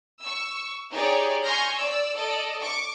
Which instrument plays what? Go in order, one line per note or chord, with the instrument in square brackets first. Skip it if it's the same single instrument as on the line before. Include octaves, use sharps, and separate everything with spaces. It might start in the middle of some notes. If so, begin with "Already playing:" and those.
[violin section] C#6 E6
D#4 G4 G#4 C#5 D5
G#5 C6 C#6 F6 G6 A#6
D5 E6
A4 D5 D#5
C#6 D6 C#7